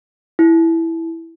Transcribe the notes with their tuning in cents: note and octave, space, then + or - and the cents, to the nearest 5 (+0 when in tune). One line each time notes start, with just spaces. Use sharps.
E4 +0